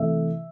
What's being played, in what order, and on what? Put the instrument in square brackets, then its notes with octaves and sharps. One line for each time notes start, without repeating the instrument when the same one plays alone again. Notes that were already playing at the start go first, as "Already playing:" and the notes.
Already playing: [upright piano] C3 E3 A3 E5